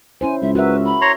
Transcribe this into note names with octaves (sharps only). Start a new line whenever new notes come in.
C#4 E4 C5 G#5
C#2 E5
F#4 A#4 B4 E5
B5
C#5 A#5 C6